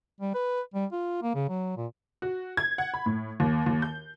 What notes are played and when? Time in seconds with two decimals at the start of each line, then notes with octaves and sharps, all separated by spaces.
0.21 G3
0.34 B4
0.74 G3
0.92 F4
1.22 A#3
1.34 C#3
1.49 F#3
1.77 A#2
2.22 F#4
2.57 G#6
2.78 F#5
2.94 B5
3.06 A2
3.40 D#2
3.66 D#2
3.82 G6